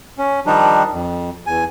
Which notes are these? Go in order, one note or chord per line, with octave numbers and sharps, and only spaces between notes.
C#4
D#3 F3 G3 D4 D#4
F2
E2 G#5